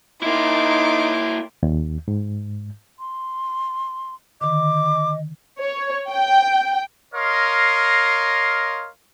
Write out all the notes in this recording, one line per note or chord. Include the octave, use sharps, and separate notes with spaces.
A#3 D#4 E4 C6 D6
D#2
G#2
C6
D3 D#3 D#5 D6
C#5
G5
A#4 C#5 D#5 F5 C6